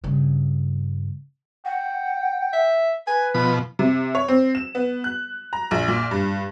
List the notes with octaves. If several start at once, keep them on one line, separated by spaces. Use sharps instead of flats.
G2 C#3
F#5 G5
E5
B4 G#5
B2 F3 B5
C3
C#5
C4
E7
B3
F#6
A#5
A#1
A#2
G2